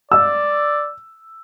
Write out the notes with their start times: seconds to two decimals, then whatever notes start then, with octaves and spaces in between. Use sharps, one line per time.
0.12 D5 E6